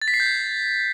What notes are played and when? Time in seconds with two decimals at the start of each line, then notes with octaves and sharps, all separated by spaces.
0.02 A6
0.08 B6
0.14 C7
0.20 G6
0.26 G#6